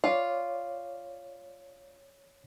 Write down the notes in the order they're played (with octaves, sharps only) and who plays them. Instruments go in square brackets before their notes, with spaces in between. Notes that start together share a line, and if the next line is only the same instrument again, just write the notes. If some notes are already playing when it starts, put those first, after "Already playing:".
[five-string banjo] F4 [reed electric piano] C#5 D5